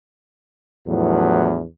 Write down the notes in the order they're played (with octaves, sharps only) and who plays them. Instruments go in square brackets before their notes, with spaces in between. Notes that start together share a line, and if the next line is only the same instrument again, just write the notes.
[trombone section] E2 A2 F3 F#3 B3 D4